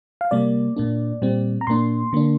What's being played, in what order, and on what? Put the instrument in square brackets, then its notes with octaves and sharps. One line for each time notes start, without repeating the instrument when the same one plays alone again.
[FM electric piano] F5
C3 G3 A#3 D5
A#2 A#3 D4
A#2 G3 C4
A#5
A#2 A#3 D4 C6
D3 A#3 D4